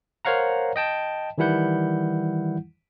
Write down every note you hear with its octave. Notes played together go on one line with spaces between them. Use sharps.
A#4 C5 C#5 F5 F#5 A#5
D#5 G5 A5
D#3 E3 G3 E4 F#5 G6